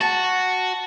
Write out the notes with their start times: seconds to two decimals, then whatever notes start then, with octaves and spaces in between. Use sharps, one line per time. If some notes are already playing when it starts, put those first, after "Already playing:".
0.01 F#4 A5